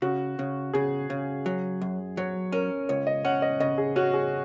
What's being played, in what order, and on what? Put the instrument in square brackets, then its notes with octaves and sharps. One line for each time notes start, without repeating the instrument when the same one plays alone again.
[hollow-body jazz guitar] C#3 [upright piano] F#4
[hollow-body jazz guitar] C#3
[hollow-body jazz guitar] C#3 [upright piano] G#4
[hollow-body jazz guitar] C#3
F#3
F#2
[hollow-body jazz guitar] F#3 [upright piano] C#5
[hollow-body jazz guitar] C#4 [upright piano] A#4
[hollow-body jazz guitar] C#2 [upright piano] C#5
[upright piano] D#5
[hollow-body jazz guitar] C#4 [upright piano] F#5
[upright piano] D#5
[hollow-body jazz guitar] C#3 [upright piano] D#5
[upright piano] G#4
[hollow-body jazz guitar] C#4 [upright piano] F#4
[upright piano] G#4